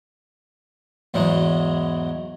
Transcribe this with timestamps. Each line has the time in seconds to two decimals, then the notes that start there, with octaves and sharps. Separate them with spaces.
1.14 E2 G#2 F#3 G#3